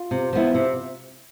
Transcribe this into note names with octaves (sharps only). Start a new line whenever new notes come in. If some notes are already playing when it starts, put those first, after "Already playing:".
Already playing: F4
C3
F3 B3 E4
C3